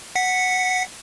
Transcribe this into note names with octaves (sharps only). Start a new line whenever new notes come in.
F#5 B6 C#7